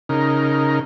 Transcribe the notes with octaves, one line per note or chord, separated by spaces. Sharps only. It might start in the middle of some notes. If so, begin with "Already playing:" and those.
C#3 D#4 A#4